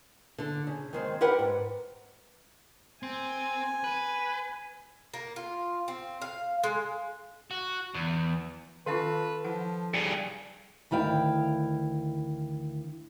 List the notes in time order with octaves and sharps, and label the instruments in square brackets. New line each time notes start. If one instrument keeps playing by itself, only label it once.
[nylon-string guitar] D3 A4
C#3
D#3 G#3 C4
G4 A#4 B4 F#5 G5
G#2
[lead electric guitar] C4 [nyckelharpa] G#5
[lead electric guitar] B4
[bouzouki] A#3
F4
C4
F5
G#3
[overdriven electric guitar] F#4
E2
[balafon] D#3 C#4 F4 [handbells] A4 F5 A5 [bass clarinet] B4
[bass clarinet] F3 [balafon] E4 F#5
[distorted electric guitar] G2 G#4
[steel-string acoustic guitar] D2 D#3 E4 F5 G5